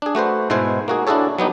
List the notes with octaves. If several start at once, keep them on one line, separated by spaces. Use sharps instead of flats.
D4 G#4
A3 F#4 B4 C5
G#2 B2 E4 B4 C5 G#5
A#3 F#4 G#4
D4 E4 F#4 G#4 A4 C#5
F#3 B3 D#4 G4